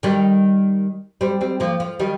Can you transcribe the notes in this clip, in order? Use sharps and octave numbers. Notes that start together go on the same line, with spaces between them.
D#3 G3
G3 C4
G3 C4
F3 A#3
F3
D#3 G3